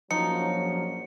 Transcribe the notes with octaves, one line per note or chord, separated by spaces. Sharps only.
A#1 F#2 F3 F#3 D#4 C#7